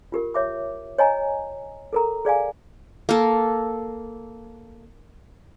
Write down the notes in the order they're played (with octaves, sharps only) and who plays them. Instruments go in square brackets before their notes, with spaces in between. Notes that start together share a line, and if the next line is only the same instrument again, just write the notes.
[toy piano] F4 G4 A#4
C#5 E5 D6
C#5 D#5 G#5 A#5
A4 A#4 A#5
G#4 D5 F5 G#5
[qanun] A#3 A4